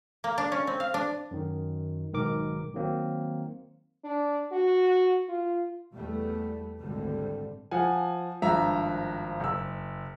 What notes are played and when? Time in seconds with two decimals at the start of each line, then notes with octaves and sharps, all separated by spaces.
0.24 A#3
0.38 D4
0.52 C#4
0.67 C4
0.80 F5
0.94 D4
1.31 F#2 D#3
2.13 B1 G#2 D#3 A#4 D6
2.74 D#3 F#3 A#3 C4
4.04 D4
4.52 F#4
5.29 F4
5.93 E2 G3 A3 B3
6.79 G#1 D2 A2 D3 G3 C4
7.71 F3 F#5 G#5
8.42 G#1 G2 F3 E5 A#5
9.40 F#1 E6